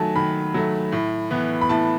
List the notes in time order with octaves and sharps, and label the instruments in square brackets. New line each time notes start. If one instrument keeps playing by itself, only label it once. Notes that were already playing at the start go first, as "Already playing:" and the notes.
Already playing: [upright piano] D#3 F#3 A3 G#5 A5
D#3 B5
F#3 A3
A2
E3 B3
B5
A2 A5